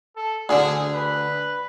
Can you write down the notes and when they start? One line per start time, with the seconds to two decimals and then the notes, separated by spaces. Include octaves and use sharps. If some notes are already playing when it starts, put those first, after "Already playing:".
0.17 A4
0.49 D2 D3 G#4
0.94 B4